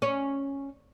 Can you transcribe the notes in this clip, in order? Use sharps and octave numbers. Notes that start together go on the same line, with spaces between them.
C#4